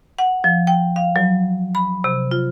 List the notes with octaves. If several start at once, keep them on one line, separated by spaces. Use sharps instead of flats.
F#5
F3
G5
F5
F#3
B5
C3
F4